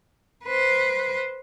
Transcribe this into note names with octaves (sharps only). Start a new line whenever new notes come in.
B4 C5